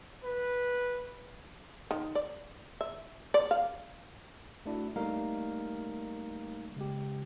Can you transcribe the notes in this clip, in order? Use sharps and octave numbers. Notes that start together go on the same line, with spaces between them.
B4
D#3
D5
E5
D5
F5
A3 D4 E4 F#4
G3 A3 A#3 D#4 A#4 F5
C#3 G#3 G4